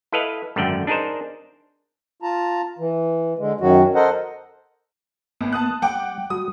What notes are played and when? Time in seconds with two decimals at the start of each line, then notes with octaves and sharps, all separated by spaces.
0.12 E4 A4 B4 D#5 F5
0.56 G#1 F#2 D3 A3 D5 G5
0.87 D4 D#4 G#4 A#4 C5
2.22 F4 A5 A#5
2.79 E3
3.39 D3 G#3
3.61 F#2 D#3 F#3 F#4
3.95 A4 A#4 C5 D#5 F#5
5.41 G#1 A#3 B3
5.53 A5 D#6 F#6
5.82 G3 F#5 G5 D6
6.30 G3 F#4 D#6